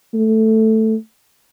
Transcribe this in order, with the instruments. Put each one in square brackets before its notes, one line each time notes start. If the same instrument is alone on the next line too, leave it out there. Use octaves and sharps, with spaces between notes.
[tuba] A3